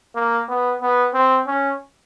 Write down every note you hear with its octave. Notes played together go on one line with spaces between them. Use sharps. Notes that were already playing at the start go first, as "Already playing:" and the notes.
A#3
B3
B3
C4
C#4